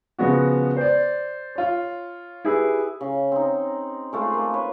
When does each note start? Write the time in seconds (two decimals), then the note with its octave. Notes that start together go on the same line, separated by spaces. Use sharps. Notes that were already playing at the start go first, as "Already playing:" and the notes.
0.18 C#3 F3 G#3 B3 F#4
0.76 C5 D5
1.56 F4 C#5
2.45 E4 G4 G#4 B4
3.01 C#3
3.32 C4 D#4
4.13 G#3 A3 F4
4.34 A#3
4.54 B4 C#5